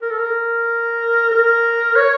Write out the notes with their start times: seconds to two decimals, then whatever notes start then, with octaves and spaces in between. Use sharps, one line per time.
0.02 A#4
0.11 A4
0.18 A#4
1.32 A#4
1.96 C#5